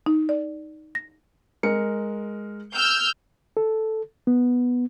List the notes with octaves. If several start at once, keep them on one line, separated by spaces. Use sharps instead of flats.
D#4
D5
A#6
G#3 A#4 C#7
E6 F6 G6
A4
B3